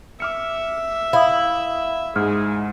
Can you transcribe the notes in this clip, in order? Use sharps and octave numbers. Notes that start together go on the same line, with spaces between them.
E5 D6 F6 C#7
E4 F5 D#6
G#2 G#3 G#4 F6